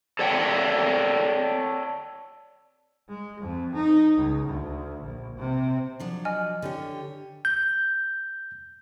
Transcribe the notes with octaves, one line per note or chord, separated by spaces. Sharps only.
A4 C#5 D5 F#5 G5
G#3
F2
D#4
C#2
D2
A#1
C3
F3 F#3 D4
D#5 G#5 F6
D3 G4 C#5
G6